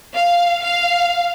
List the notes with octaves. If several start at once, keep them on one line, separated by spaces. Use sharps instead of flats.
F5
F5